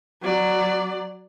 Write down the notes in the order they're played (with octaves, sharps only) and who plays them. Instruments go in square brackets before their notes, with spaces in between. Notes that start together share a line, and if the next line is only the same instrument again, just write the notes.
[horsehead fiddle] F#3 D5